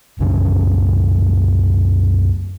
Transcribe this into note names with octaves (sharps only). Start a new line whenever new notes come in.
C2 F#2 C#3 C#4